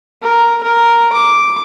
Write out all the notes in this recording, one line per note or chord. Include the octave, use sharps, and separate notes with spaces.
A#4
A#4
D6